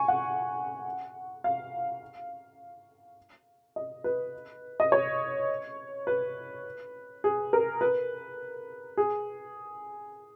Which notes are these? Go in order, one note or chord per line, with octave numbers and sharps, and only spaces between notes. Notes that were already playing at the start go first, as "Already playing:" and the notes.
Already playing: G#5 C#6
F#5
F5
D#5
B4
D#5
C#5
B4
G#4
A#4
B4
G#4